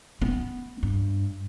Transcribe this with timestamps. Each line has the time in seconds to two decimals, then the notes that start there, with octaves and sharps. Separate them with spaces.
0.22 B3
0.83 G2